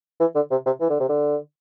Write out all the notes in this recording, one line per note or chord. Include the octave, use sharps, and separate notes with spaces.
E3
D3
C3
C3
E3
D3
C3
D3